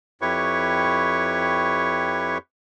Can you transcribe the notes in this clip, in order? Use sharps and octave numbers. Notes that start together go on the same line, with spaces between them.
F2 E4 G4 B4 C#5 C#6